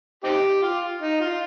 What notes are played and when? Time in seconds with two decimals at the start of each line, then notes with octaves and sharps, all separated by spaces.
0.24 C4 D#4 G4
0.62 F4
1.01 D#4
1.21 F4